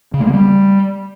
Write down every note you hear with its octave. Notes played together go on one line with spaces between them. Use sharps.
C#3
A3
A#3
G3